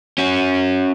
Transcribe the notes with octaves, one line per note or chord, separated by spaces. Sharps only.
C#4 F#4